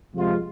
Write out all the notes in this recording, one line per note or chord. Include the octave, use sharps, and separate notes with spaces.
F2 C3 G#3 F4